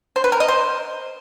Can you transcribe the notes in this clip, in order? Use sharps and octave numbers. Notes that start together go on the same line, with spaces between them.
C5
B4
A#4
D#5
C5